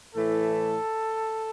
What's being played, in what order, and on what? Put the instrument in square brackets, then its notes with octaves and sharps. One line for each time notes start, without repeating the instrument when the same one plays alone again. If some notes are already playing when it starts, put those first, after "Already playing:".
[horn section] A2 E3 A3 A4